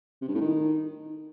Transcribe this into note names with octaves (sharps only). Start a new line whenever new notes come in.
C3
G2
A2
D#3